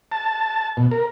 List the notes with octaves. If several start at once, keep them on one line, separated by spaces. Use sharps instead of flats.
A5
B2
A#4